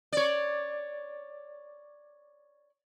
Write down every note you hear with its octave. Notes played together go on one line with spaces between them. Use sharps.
C#5 D5